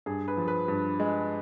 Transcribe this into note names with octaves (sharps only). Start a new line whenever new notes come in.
G2 G#4
B4
F3
B4
G2
G#3